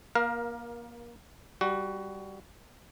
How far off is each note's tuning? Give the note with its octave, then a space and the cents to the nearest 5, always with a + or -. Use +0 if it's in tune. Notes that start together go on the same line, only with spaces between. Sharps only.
A#3 +30 A#4 +20 F5 +0
G3 +0 F#4 +15